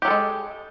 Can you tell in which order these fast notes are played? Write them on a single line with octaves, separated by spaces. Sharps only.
G4 F#3 A4 G#3